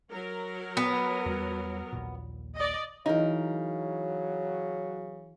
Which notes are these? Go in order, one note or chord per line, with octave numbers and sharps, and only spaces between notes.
F#3 A#4
B3
E2 G3
A#1 D#2 A#2
D5 D#5
C#3 E3 F#3 D#4 E4 A#4